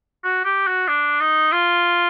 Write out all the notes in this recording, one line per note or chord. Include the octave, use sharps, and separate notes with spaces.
F#4
G4
F#4
D4
D#4
F4